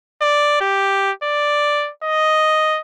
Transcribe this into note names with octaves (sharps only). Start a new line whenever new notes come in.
D5
G4
D5
D#5